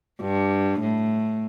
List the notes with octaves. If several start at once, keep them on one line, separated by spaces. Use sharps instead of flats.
G2
A2